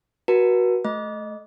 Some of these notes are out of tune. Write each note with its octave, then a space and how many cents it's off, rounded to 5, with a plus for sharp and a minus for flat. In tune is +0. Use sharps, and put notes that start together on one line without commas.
F#4 +0 B4 -40 A5 +45
A3 -20 D#5 +0